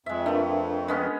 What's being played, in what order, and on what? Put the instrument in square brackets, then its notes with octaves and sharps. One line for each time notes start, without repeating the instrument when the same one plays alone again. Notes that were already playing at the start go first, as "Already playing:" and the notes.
[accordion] F2 [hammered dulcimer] G#3 E5
[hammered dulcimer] F3 A3 [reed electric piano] D4 A#4 B4
[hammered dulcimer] G#3 B3 C#4